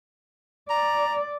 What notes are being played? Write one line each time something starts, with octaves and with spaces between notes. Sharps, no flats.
D5 A#5